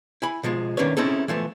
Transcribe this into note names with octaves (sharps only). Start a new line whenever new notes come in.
E4 G#5 B5
B2 F3 G#3 F4
D#3 A#3 C#4 D4 B4 C#5
C4 C#4 D#4 E4 G#4 A4
E3 F3 A3 B3